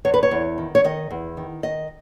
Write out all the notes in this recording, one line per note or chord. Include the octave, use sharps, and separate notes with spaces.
E2 C#5
B4
C#5
E2
D#3
C#5
D#3 D#5
E2
D#3
D#3 D#5